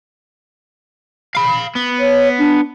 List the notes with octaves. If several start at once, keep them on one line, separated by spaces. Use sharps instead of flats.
F5 B5
B3
C#5
D4